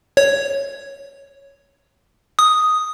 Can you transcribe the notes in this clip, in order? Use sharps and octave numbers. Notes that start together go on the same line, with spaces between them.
C#5
D#6